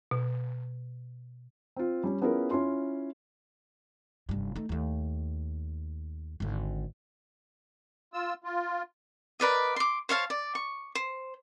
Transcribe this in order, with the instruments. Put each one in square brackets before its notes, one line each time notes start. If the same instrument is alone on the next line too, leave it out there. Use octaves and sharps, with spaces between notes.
[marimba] B2
[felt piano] C4 F4
G3 C#4
B3 C#4 E4 F4 G#4 A#4
C#4 E4 F4 C6
[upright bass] F1 G2
A3 D#4
D#2 A3
G#1 D3
[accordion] F4 E6
F4
[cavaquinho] A#4 B4 D5 D#5
C6 D6
C5 C#5 F5 A5
D5
C#6
C5